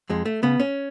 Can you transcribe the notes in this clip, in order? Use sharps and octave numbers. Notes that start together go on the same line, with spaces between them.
F2 G#3
A3
C#3 B3
C#4